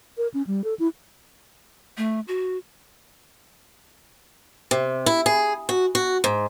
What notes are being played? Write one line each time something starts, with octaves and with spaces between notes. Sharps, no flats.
A#4
C#4
G3
A4
E4
A3
F#4
C3
E4
G#4
F#4
F#4
G#2